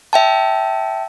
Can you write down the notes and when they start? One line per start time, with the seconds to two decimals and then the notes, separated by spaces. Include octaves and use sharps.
0.13 E5 G5 A5